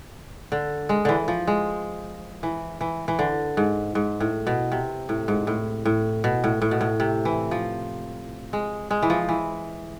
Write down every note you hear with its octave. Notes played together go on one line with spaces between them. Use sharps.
D3
G#3
D3 E3
F3
G#3
E3
E3
E3
D3
G#2
G#2
A2
B2
C3
A2
G#2
A2
A2
B2
A2
A2
B2
A2
C3
E3
F3
G#3
G#3
E3
F3
E3